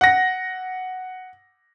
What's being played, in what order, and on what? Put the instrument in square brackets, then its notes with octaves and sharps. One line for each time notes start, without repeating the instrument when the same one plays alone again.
[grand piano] F#5 A#6